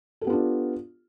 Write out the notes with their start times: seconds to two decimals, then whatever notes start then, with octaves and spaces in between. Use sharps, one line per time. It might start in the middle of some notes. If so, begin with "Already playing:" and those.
0.21 A4
0.24 G4
0.27 B3
0.30 F4
0.33 D4